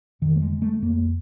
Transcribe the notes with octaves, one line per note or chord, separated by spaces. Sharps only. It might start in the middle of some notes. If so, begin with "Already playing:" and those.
F2 D#3
A3
G#3
D3
A3
F2 A#3